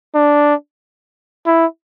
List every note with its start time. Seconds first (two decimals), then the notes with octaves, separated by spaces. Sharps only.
0.15 D4
1.46 E4